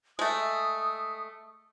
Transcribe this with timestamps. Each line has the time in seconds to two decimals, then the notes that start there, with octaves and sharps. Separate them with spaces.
0.19 G#3 A3 D#6